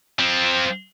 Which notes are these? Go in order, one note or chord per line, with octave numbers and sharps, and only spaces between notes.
F3 C4